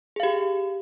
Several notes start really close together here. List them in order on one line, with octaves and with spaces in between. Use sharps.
G#4 F5 G4